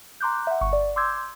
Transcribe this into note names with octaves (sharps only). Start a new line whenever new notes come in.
A#5 C6 D6 F#6 G6
E5 F#5
G1 F#5 C#6
D5
C6 D6 E6 G6 G#6